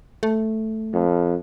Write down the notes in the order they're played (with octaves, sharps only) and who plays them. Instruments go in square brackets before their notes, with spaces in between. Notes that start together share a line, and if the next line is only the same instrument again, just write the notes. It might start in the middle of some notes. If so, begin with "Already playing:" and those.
[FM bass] A3
[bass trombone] F2